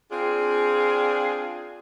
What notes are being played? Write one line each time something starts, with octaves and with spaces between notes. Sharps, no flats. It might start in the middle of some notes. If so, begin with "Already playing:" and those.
C4 D4 F4 G#4